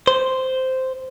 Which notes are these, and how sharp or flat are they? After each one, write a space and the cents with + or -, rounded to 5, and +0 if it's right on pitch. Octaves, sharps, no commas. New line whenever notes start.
C5 -5